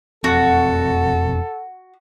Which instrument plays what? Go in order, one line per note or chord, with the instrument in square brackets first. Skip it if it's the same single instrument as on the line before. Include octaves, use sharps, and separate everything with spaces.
[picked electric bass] E1 F2 C4 [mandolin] F#4 [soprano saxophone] A4